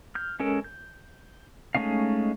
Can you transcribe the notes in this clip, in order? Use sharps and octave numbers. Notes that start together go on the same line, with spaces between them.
F6 G6
G#3 C#4 A4 A#4
G6
G#3 A3 C#4 D#4 F5